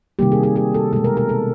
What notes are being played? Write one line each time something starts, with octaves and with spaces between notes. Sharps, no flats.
C3 D#3 G3 A#3 G4
G#4
G#4
G#4
A4
B2 G#3 A4
A#4
A#4
A4